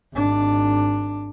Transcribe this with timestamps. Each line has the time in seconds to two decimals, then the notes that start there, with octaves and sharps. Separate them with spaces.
0.13 G#1 D4